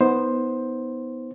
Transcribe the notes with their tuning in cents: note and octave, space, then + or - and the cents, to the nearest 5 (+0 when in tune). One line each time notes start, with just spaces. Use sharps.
B3 +0 D#4 +30 C5 +5